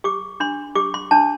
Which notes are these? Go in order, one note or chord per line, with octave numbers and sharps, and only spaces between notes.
G4 D6
D4 C6
G4 D6
C6
D4 A5